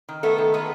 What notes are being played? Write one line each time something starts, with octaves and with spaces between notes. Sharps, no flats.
D#3
A3 B3 A4
D#3
G#3 B3 B4